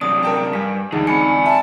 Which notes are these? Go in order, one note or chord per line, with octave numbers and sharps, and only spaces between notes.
F#2 C3 D4 D#6
A#4 G5 A5
G2 G#5 B6
E1 D2 E3 D#4 G#4
C4 D5 G#5 B5 C#7
E5 A5